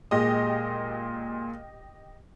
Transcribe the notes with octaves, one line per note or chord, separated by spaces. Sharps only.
A#2 G#3 G4 D#5